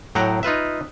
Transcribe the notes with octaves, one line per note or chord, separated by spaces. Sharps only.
A2 F#3 F#5 G5 A#5
D#4 F4 B4 E5